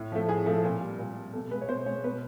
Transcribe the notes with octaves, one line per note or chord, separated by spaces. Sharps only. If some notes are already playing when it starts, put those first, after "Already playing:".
Already playing: A2
F3 A3
A2 G#4
F3 A3 A4
A#2
G3
A#2
G3
B2 A4
G#3 B4
C#5
B2 C5
G#3 C#5
B2 B4